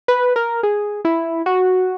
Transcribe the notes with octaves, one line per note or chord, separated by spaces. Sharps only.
B4
A#4
G#4
E4
F#4